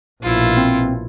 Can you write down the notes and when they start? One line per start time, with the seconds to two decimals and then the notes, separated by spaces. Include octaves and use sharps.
0.22 A#1 B2 E4 F4
0.57 C4